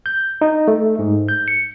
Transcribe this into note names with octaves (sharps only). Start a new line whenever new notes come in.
G6
D#4
A3
G#2
G6
C#7